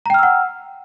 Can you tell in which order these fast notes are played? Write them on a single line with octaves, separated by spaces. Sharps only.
A#5 G5 F6 E6 F#5